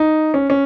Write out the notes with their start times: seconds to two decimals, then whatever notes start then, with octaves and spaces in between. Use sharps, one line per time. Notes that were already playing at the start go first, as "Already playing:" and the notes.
Already playing: D#4
0.34 C#4
0.50 C#4